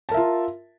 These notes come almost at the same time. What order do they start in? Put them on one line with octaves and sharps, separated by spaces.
A5 A#4 E5 F4